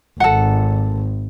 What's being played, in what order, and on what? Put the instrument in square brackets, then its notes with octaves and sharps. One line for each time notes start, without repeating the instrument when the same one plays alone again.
[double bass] G#1 [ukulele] A4 F#5